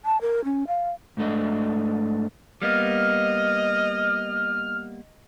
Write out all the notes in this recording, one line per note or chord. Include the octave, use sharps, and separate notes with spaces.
A5
A#4
C#4
F5
G#2 A3 D4 D#5
G3 A#3 B3 D#5 F6